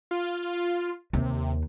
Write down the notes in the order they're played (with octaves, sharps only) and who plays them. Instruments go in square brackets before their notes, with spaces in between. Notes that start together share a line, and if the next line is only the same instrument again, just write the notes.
[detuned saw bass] F4
[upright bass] D#2 [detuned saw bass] C3